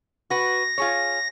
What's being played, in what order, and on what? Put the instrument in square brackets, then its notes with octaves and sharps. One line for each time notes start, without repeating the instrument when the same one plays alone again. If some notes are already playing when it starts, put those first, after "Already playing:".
[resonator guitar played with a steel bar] F#4 B4 [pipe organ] A#6
[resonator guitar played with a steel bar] F4 G#4 C#5